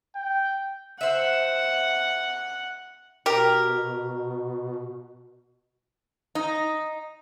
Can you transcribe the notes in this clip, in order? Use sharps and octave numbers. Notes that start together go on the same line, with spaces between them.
G5
C5 E5 F#5
B2 G4 A#4
D#4